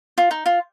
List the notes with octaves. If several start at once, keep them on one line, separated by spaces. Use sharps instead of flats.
F4
D#4
F4